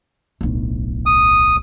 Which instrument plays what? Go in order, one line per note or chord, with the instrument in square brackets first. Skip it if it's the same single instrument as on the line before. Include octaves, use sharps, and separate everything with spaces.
[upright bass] D1 B1
[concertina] D#6